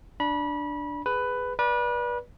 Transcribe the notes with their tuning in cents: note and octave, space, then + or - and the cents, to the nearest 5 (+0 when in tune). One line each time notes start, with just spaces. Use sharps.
D4 +0 B5 -30
G#4 +0 B4 +10
B4 -30 D5 +0